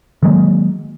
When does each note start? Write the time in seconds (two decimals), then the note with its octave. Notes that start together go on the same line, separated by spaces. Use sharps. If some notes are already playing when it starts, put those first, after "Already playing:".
0.23 D#3 F#3 G#3 A#3